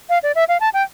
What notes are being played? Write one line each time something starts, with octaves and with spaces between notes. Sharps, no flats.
F5
D5
E5
F5
A5
G5